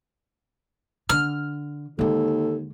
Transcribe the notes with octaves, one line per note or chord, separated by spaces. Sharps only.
D3 F6
D#2 D3 G#3 A4